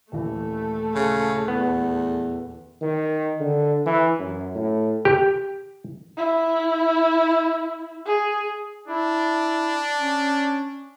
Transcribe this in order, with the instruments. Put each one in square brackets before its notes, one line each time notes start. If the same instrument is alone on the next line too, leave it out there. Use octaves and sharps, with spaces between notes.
[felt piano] D#1 E3 [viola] A3
[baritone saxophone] C#3
[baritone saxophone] E2 [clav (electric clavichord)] B3
[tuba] D#3
D3
E3
F#2
A2
[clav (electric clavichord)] G4
[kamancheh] E4
G#4
[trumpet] D4 [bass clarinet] E4
[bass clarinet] C#4